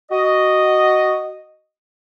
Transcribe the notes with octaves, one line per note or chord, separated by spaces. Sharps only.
F#4 D#5